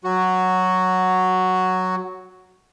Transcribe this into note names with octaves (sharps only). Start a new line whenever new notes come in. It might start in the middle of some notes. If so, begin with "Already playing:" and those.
F#3 F#4